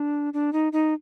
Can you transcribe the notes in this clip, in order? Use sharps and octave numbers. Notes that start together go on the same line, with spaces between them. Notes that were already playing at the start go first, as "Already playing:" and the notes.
Already playing: D4
D4
D#4
D#4